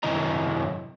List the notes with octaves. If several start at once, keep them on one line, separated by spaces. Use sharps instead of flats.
F#2 C3 D#3 E4 D#5 A#5